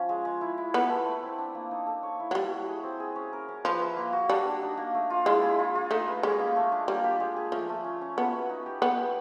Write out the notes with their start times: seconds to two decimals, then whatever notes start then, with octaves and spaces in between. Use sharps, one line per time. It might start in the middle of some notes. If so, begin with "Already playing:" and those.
Already playing: F3 C#4
0.09 G#3
0.25 G#3
0.41 E4
0.58 E4
0.74 B3 E4
0.90 A4
1.06 A3
1.23 C4
1.38 D4
1.55 A#3
1.71 D#4
1.87 A4
2.03 C#5
2.20 E4
2.31 F#3
2.35 G3 C#5
2.52 F#4
2.68 G#4
2.83 C4
3.00 G#4
3.16 C#4
3.33 A#4
3.48 C#4
3.65 F3 B4
3.81 E5
3.97 A#3
4.13 F#4
4.29 G3 D4
4.45 D4
4.62 D#4
4.78 A#3
4.94 A3
5.10 F4
5.26 G#3 E4
5.42 G#4
5.59 F4
5.75 F4
5.91 A3 D#4
6.07 B4
6.23 G#3 C#4
6.39 A#3
6.56 A3
6.72 D4
6.88 G3 A#3
7.04 G4
7.20 G#3
7.36 G#4
7.52 F3 A3
7.69 A3
7.84 C#4
8.01 C#4
8.17 B3 B4
8.33 F#4
8.49 D#4
8.66 G4
8.81 B3 G4
8.99 G4